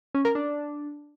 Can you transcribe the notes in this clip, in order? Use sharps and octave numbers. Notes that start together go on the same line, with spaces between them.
C#4
A#4
D4